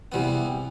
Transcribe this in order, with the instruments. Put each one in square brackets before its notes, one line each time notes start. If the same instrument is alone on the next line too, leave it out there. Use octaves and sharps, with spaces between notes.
[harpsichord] E2 C3 E3 G3 B3